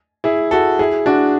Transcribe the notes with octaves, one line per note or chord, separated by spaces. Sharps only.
E4 G#4
F#4 A4
E4 G#4
D4 F#4